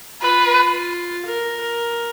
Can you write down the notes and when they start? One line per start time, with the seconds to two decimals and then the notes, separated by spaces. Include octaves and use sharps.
0.21 F4 B4
1.25 A#4
1.60 A#4